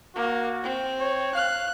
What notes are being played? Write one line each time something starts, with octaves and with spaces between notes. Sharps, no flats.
A#3 F#4
C4
C#5
F5 F#6